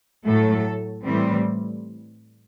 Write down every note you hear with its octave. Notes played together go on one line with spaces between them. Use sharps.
A2 F#3 A3 A4
A2 E3 G3 C4